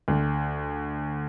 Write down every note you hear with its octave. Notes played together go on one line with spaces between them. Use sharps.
D2